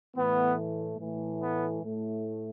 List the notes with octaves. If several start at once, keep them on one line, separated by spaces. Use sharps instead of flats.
A2 E3 A3 B3
A2 E3 A3
B3
A2 A3